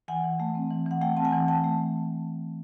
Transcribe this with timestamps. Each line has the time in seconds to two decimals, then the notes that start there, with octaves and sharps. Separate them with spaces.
0.08 E3 F#5 G#5
0.24 E3
0.40 A3
0.55 C4
0.71 E3
0.86 E3 F#5
1.01 A3 F5 G5
1.17 C4 A5
1.25 F#5 G#5
1.32 E3
1.48 E3 G5 A5
1.64 A3